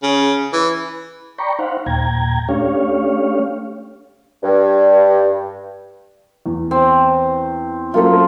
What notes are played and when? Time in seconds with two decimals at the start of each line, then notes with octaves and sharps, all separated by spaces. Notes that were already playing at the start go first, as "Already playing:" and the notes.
0.03 C#3
0.53 E3
1.38 D5 G5 A#5 B5 C#6
1.59 D#4 C5 F5 F#5
1.86 D#2 A#2 G5 A#5 G#6
2.49 A3 C#4 D4 G4 C#5 F5
4.43 G2
6.46 E2
6.71 C4
7.94 F#3 A#3 C#4 F4 A4